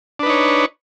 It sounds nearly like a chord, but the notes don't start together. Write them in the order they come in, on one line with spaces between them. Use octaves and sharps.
D4 B4 D#4 C#5